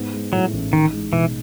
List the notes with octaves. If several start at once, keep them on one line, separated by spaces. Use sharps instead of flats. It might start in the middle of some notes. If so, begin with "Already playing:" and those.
Already playing: G#2 B3
G#3
A2 F#3
A1
D#3 D#4
G#3
B2 E3